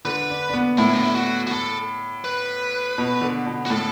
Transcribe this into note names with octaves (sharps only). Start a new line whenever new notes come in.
D3 B4
D4
D4
B3
A2 E4
D4
E4
F#4
F#4
A4
B4
B2
D3
B2
F#4
A2 A4